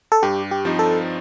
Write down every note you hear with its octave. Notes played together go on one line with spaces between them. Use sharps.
A4
G2 G4
G4
F3 C4 D#4
A4